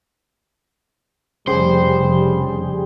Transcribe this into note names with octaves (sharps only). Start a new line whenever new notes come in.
F1 C#3 G3 G4 G#4 C5